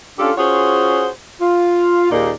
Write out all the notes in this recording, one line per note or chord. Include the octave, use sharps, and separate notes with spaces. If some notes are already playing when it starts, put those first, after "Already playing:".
C#4 D4 F4 G4 A4
C#4 F4 F#4 G#4 C5 C#5
F4
D#2 A#2 A#3 D#4 G#4 D5